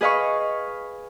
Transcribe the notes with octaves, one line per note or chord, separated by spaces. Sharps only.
G#4 B4 D#5 F5 B5 C#6